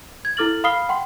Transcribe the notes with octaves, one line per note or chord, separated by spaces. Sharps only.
G#6
E4 A4 D6 F6 A6 F#7
F5 B5 D#6 F6 C7 G7
F#5 G5 C6